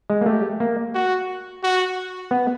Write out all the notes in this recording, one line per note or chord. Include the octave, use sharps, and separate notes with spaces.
G#3
A#3
A3 G4
A#3
F#4
F#4
B3